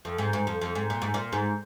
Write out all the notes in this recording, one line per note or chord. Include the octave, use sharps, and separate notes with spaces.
F2
G#2
G#2
F2
F2
G#2
A#2
G#2
A#2
G#2